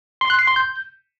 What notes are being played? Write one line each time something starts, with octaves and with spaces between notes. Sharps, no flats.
C6
F#6
C7
C6
G6